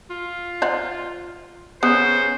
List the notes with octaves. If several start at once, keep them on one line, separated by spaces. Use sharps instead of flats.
F4
C5 D5 F#5
C#3 B3 C5